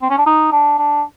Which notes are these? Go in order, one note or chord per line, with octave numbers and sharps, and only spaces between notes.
C4
C#4
D4
D#4
D4
D4